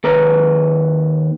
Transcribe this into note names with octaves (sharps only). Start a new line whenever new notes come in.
D#2 A4 B4 A#5